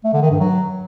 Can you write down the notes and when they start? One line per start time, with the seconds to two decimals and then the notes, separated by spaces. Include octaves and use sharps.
0.04 A3
0.13 D3
0.22 D#3
0.31 G2
0.40 F#3